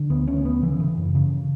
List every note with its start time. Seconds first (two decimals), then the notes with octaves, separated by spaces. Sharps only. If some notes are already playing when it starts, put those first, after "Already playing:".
Already playing: D3
0.10 D2 B3
0.27 D2 C#4
0.45 D3 B3
0.63 C#3 E3
0.80 C#3
0.97 F#2
1.15 C#3